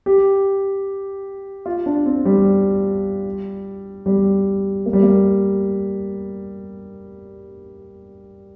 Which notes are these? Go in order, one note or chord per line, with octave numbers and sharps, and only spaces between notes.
G4
F4
D4
C4
G3
G3
A#3
G3
A#3